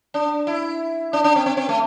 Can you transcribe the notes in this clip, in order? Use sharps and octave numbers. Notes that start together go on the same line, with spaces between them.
D4
E4
D4
D4
C4
C4
C4
A3